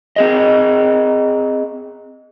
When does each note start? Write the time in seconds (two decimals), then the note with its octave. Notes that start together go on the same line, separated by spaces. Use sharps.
0.16 C4 G#4 D#5